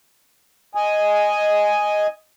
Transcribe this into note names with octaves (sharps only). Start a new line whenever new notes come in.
D#5 G#5